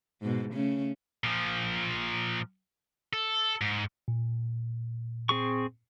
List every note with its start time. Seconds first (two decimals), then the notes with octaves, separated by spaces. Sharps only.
0.22 G#2 B2
0.54 C#3 A3 C#4
1.24 A#2 F3
3.13 A4
3.61 G#2
4.08 A#2
5.29 C4 G#4 C#6